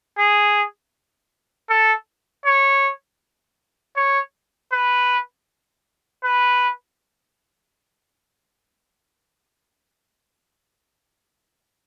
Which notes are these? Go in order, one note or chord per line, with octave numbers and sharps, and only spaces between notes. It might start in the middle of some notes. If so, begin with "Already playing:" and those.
G#4
A4
C#5
C#5
B4
B4